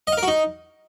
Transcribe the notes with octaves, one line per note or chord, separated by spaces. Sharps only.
D#5
F5
A#4
F#4
D#4